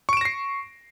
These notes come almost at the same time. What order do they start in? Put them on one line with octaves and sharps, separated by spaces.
C#6 D7 E7 A#6 C7